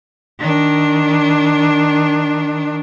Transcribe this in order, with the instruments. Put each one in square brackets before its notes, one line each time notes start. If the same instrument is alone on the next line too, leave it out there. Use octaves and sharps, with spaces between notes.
[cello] D#3 D4